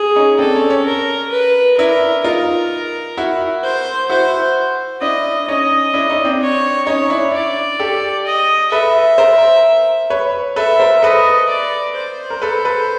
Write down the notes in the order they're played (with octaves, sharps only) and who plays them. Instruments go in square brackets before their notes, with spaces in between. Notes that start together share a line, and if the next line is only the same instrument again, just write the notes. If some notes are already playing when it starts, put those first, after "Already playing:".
Already playing: [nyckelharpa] G#4
[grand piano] C#4 D#4
[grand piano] C4 D4 [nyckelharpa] A4
[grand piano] C#4
C#4
[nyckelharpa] A#4
B4
[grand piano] D4 E4 [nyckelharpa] A#4
[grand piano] D#4 F4 [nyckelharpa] A#4
[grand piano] E4 F#4
[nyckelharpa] C5
[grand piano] E4 F#4 [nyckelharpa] C5
[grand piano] D4 E4 [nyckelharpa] D#5
[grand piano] C#4 D#4 [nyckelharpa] D#5
[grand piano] D4 E4
C#4 D#4
C4 D4
[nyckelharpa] C#5
[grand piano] C#4 D#4 [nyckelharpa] C#5
[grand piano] D4 E4
[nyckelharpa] D5
[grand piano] G4 A4
[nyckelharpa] D#5
[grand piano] A4 B4 [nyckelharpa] E5
[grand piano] A#4 C5
B4 C#5
[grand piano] A4 B4 [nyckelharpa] E5
[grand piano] A#4 C5
[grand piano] A4 B4 [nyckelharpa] D#5
[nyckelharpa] D5
C5
[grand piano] A#4
A4 B4
A4 B4